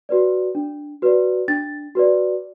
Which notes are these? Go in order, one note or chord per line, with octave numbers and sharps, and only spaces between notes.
F#4 B4 D5
D4
F#4 B4 D5
D4 A6
F#4 B4 D5